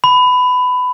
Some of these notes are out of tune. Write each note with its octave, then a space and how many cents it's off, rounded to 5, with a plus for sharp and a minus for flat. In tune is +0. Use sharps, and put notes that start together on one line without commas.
B5 +20